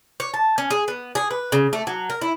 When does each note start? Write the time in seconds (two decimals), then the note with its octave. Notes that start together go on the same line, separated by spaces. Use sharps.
0.20 C#5
0.34 A5
0.58 C#4
0.71 G#4
0.88 B3
1.15 G#4
1.31 B4
1.52 C#3
1.73 A3
1.87 F#3
2.10 A#4
2.21 E4